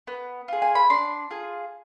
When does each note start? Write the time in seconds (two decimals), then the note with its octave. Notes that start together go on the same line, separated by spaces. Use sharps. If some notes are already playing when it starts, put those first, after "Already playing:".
0.07 B3
0.48 F4 G#4
0.62 G#5
0.75 B5
0.90 D4 C6
1.31 F4 G#4